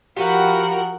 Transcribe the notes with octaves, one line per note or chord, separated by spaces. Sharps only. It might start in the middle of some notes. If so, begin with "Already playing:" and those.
F3 F#4 G4 A#4 B4 F5 F#5